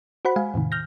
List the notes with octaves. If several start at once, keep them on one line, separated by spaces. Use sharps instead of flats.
F#4 C5 F#5 B5
G#3 F5 G#5
E2 A2 C3 D#3
F6 G6 A#6